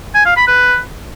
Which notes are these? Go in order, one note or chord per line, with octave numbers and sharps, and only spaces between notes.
G#5
F5
B5
B4